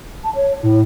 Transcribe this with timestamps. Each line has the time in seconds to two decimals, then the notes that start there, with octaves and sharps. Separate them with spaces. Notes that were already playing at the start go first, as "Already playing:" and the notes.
0.24 A5
0.36 C#5
0.63 A2 E4